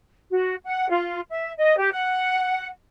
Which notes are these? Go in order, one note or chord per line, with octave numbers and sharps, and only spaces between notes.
F#4
F#5
F4
E5
D#5
G4
F#5